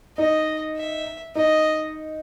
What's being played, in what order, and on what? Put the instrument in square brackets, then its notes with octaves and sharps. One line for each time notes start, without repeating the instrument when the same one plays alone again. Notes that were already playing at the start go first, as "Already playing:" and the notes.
[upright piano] D#4 [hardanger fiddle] D#5
[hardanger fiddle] E5
[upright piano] D#4 [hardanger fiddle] D#5